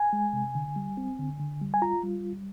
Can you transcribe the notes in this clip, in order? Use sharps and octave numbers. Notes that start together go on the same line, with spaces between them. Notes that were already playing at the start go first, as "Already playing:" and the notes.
Already playing: G#5
G#3
C3
D3
G3
C4
D3
D3
G3
G#5
F4 A#5
G3